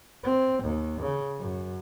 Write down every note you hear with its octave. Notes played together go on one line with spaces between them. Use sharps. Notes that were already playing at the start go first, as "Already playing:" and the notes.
C4
D#2
C#3
F#2